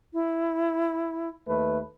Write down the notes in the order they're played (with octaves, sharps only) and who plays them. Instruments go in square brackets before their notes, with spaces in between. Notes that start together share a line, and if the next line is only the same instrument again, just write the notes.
[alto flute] E4
[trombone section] D#2 A3 B4